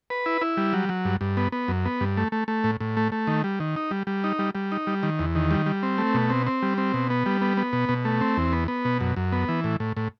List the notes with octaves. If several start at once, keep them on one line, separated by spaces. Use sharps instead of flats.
B4
E4
E4
G3
F#3
F#3
G2
G2
B3
B3
F#2
B3
G2
A3
A3
A3
A2
A2
A3
A3
D#3
G3
D#3
D#4
G3
G3
D#4
G3
G3
D#4
G3
D#3
E2
D#3
G3
G3
C4
A3
B2
C4
C4
G3
C4
B2
B3
G3
B3
B3
B2
B2
A3
C4
E2
B3
B3
B2
F#2
F#2
B3
E3
A2
A2
A2